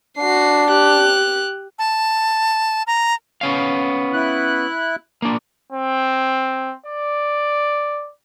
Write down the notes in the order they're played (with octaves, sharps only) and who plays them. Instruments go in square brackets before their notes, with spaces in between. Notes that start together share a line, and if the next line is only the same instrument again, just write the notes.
[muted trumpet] D4 [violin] F#4 C7
[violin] G4 F#6
[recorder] A5
A#5
[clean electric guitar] B3 C#4 F5
[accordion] E4 F#6
[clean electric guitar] A#3 D4
[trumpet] C4
D5